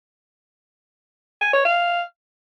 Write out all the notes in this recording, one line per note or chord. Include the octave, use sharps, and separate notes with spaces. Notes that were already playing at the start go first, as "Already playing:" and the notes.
G#5
C#5
F5